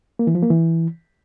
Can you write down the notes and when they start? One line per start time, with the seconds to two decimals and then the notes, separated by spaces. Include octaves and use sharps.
0.19 A#3
0.27 E3
0.35 F3
0.43 A#3
0.50 E3